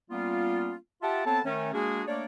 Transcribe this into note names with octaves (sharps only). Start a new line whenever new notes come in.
G3 A#3 B3 C#4 F4
F4 G4 E5 F#5 A5
B3 C4 A4 C#5 A5
D#3 A3 C#4
G#3 A#3 D4 F#4 G#4
A3 A#3 D4 C#5 D5